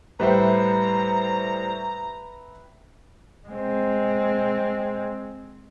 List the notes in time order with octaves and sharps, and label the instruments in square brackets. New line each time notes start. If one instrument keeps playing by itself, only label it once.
[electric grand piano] A2 G3 C5 [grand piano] B4 E5 G5 [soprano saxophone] A#5
[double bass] G#3 C4